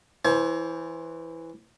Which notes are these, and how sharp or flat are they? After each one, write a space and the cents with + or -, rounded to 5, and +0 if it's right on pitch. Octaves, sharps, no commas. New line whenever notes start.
E3 +0 C5 +25 G#5 +35